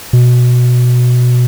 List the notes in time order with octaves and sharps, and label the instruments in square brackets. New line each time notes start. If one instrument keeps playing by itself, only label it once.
[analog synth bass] B2